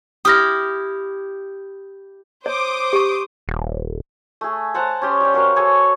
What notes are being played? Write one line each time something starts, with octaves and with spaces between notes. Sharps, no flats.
E4 G4 D#6 F6 A#6
C5 C#5 D6 D#6
G4 C#6
D#1
A3 G#4
C5 F#5 A5 A#5
C#4 G4 C6
G3 G5
F#4 A#4 C5 F5
F#4 G#4 A4 C#5